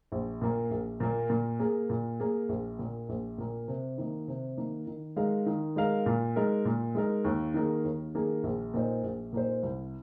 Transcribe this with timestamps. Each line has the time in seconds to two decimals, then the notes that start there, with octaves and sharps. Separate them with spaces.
0.12 A#1
0.41 A#2 A#3
0.71 A#1
1.00 A#2 A#3
1.30 A#2
1.60 A#3 G#4
1.90 A#2
2.20 A#3 G#4
2.49 A#1
2.79 A#2 A#3
3.09 A#1
3.38 A#2 A#3
3.68 C3
3.98 D#3 A#3
4.28 C3
4.58 D#3 A#3
4.87 D#3
5.16 G#3 D#4 A#4 F5
5.46 D#3
5.76 G#3 D#4 A#4 F5
6.06 A#2
6.36 G#3 D#4 A#4
6.65 A#2
6.95 G#3 D#4 A#4
7.24 D#2
7.54 D#3 A#3 G#4
7.84 D#2
8.15 D#3 A#3 G#4
8.43 A#1
8.74 A#2 A#3 D#4 C5
9.03 A#1
9.33 A#2 A#3 D#4 C5
9.63 C2